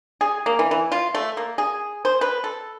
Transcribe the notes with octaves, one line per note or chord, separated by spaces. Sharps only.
G#4
A#3
E3
E3
F4
A3
A#3
G#4
C5
B4
A4